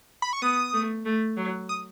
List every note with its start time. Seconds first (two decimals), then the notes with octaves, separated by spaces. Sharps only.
0.22 B5
0.33 C#6
0.42 B3 D#6
0.73 A3
1.06 A3
1.37 F#3
1.69 D#6